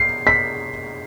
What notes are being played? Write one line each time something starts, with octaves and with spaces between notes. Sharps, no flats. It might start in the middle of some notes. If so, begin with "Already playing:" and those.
Already playing: C7
B6